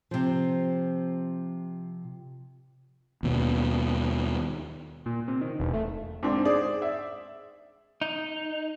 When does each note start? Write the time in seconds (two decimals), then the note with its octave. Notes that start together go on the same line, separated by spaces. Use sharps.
0.11 C3 F3
3.23 D#2 B2
5.06 A#2
5.28 C3
5.41 D#3
5.59 E1
5.74 A3
6.23 G#2 C4 D4
6.45 G#4 C5 D5
6.82 E5
8.01 D#4